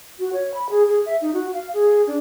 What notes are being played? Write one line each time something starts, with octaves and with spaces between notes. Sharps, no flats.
F#4
C#5
B5
G#4
G#4
E5
D#4
F#4
F5
G#4
D4